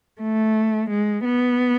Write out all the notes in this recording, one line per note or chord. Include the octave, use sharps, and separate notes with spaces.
A3
G#3
B3